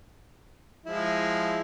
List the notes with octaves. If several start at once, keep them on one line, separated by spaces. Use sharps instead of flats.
F3 G#3 E4